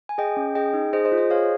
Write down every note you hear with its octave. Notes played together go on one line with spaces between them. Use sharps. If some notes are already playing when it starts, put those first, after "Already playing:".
G#5
G#4 D#5 G5
C#4
G#4 D#5 G5
D#4
G#4 C5 D#5
C5 D#5
F4
C5 D#5
G#4 C#5 F5